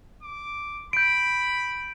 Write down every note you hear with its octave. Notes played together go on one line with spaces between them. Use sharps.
D6
B5 G6 D7